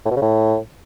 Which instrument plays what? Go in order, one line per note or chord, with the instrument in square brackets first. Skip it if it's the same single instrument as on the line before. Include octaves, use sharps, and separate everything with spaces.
[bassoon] A2
B2
C#3
A2